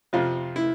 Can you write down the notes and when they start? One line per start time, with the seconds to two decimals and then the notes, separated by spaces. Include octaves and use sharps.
0.13 F2 C3 F3 F4
0.56 E4